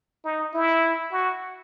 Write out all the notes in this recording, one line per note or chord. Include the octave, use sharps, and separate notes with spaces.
D#4
E4
F#4